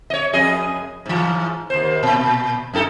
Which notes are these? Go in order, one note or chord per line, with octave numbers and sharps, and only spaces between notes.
C#5 D#5
F2 G#4 D#5
G#2 E3
D#2 C5
A#2
F#2 D#4 A4